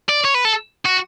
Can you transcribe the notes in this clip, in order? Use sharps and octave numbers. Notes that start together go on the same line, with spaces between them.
D5
C#5
B4
A4
F#4